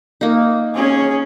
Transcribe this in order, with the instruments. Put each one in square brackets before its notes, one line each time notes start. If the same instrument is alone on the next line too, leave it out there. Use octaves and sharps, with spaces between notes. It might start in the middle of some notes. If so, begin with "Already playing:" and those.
[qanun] A#3 D#4
[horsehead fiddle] C#4 G#4